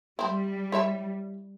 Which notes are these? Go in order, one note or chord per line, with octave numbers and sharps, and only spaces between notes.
G3 C4 E4
E4 C#5 E5